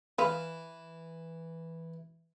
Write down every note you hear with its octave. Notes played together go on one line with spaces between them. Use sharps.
E3 B4 F5